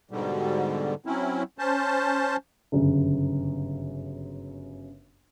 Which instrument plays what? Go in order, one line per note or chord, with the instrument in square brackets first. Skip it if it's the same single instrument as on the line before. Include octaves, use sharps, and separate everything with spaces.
[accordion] G#2 B2 D3 G3
F#3 C4 C#4 E4
C#4 C5 A5
[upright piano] G1 F#2 C#3